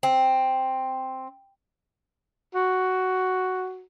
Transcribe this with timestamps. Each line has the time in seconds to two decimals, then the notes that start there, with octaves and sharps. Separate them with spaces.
0.03 C4
2.55 F#4